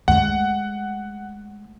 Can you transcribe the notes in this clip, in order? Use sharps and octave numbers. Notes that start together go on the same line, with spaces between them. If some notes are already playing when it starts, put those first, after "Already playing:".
G#3 A3 F#5